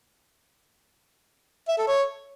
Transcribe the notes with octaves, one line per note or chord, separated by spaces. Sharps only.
E5
A4
C#5